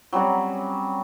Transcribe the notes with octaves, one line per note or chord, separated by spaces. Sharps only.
F#3 G3 C4 C#4